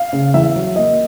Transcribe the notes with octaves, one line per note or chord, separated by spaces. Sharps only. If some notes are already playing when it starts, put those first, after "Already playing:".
Already playing: F5
C#3
E2 E5
F#3
A#3 D#5